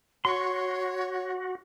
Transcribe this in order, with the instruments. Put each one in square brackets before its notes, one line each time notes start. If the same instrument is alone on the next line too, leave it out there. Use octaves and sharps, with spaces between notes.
[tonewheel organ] F#4 [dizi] C#5 [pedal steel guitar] C6 C#6